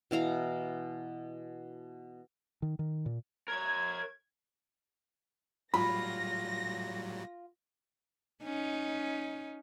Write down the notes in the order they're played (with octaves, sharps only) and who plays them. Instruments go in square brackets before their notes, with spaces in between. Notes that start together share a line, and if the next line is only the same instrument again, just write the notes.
[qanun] B2 E3 F5 A#5
[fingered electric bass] D#3
D#3
A#2
[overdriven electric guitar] A#4 C#5 [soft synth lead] G#6
[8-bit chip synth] A2 F#3 G3 [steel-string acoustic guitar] F4 [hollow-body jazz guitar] B5 [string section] A#6
[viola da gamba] C#4 D#4